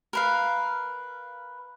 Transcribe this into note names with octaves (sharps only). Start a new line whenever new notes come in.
A#4 B4 F5